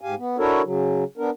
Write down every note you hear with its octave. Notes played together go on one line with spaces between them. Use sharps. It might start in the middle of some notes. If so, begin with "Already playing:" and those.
G#2 G4 F5 G#5
B3
D4 E4 F#4 A4 A#4 C#5
C#3 F#3
B3 D4 A#4